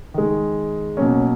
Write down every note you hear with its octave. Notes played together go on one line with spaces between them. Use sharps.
D#3 G#3
B2 F#3 A#3 C#4